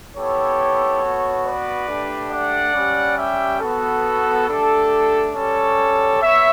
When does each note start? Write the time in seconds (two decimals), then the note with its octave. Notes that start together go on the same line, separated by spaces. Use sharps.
0.15 B3 E4 G4 A4 C#5
1.02 B3 F#4
1.45 B4 D5
1.88 A3 D4 G4
2.31 D5 F#5
2.74 G3 C#4 G4
3.18 E5 G5
3.61 B3 F#4 A4
4.48 A3 D4 G4 A4
5.34 G3 C#4 G4 A4 C#5
6.22 B3 C#5 E5